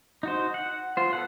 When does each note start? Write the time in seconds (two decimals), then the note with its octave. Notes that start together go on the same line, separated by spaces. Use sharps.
0.23 D#4 F#4 C5
0.54 F#5
0.97 F4 C5
1.13 B3 A4 F#5